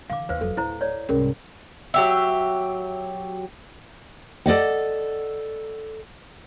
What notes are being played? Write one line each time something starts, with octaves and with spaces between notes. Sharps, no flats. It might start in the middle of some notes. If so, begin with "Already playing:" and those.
D3 E3 F5 D6
D#2 B4 C5 F5
F1 F#3 A4
D1 E4 C5 A#5
C#5 D5
C2 G#2 C#4 G#4 A#4
F#3 G4 E5
A4 D5 D#5 F#5